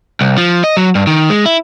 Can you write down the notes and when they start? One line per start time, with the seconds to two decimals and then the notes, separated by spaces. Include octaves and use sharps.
0.21 C2
0.38 F3
0.64 D#5
0.77 F#3
0.95 G2
1.07 D#3
1.30 G#3
1.46 E4